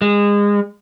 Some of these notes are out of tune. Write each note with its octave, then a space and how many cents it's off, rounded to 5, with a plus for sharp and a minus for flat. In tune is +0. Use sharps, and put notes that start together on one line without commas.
G#3 -25